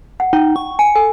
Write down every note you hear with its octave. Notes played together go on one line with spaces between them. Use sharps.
F#5
D#4 G5
C#6
G#5 C#7
A4 G#5